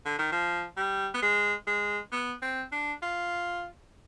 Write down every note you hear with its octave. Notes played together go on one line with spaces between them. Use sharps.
D3
D#3
F3
G3
B3
G#3
G#3
B3
C4
D4
F4